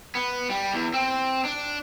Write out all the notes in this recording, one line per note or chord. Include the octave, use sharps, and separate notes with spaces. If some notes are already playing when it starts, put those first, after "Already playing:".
B3
G3
E2
C4
D4